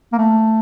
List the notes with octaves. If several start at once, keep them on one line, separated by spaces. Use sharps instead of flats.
A#3
A3